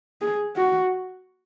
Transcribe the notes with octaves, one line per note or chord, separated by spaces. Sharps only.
G#4
F#4